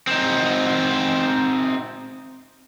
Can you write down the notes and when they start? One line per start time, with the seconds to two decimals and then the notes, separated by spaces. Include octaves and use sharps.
0.07 C4 D#4